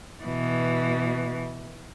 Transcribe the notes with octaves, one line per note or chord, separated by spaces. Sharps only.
B2 E3